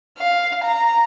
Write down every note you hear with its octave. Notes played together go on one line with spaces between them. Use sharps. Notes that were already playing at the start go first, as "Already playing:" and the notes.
F5
A#5